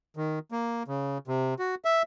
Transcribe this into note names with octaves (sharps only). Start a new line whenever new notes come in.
D#3
A#3
C#3
C3
F#4
E5